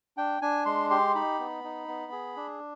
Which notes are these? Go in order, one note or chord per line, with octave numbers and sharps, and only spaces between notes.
D4 G5
D4 G#5
G#3 C6
G4 C6
D#4 B5
B3
D#4
B3
G#4
D4